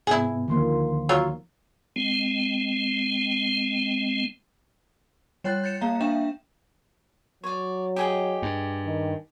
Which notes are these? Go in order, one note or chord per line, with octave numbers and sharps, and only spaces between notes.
G#2 C3 B3 E4 G#4
D2 D3 D#3 F3 A#3 C6
F#3 F4 C#5
G#3 C4
G3 C#5 G5 F#6 A6
G6 A6 C#7 E7
A#3 F5 A#5
D4 E5 F5 G5 E7
F#3 C#5 D5
G4 G#4 D#5
G2
D#3